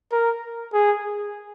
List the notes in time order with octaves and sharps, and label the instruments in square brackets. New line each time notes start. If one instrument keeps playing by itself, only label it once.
[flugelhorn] A#4
G#4